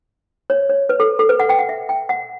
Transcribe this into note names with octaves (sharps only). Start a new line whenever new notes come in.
C#5
C#5
B4
A4
A4
B4
F#5
G5
F#5
E5
G5
F#5